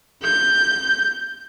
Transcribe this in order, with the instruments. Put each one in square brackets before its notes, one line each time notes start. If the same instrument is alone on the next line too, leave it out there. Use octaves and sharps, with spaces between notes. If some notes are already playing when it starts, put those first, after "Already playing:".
[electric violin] G6